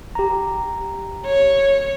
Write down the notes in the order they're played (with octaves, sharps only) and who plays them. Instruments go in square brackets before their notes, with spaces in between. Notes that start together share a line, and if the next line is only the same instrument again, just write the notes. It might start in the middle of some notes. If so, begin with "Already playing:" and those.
[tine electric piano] G4 A#5
[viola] C#5